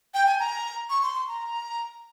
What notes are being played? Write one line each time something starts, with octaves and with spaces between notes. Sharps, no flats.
G5
G#5
A#5
C#6
C6
C6
A#5